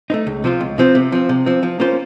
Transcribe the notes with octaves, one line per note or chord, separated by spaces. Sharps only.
A3 C4 D#4
C#2
C3 F3 C4 F4
C#2
C3 F3 C4 F4
C3
F3 C4
C3
F3 C4
F3
A#3 C#4 F4 C5